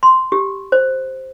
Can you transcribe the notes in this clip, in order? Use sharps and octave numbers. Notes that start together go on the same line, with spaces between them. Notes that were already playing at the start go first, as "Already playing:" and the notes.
C6
G4
C5